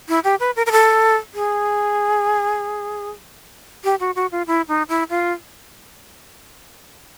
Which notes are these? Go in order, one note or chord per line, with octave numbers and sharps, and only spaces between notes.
E4
G4
B4
A#4
A#4
A4
G#4
G4
F#4
F#4
F4
E4
D#4
E4
F4